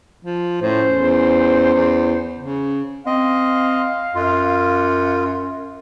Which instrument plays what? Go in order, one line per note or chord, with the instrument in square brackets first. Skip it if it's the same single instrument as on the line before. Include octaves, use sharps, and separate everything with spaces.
[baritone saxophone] F3
[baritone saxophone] A2 [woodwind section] C#4 C5
[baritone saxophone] E2
E2
C#3
[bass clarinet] C4 [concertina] D#5 [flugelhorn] F5
[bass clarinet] F#2 [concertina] F4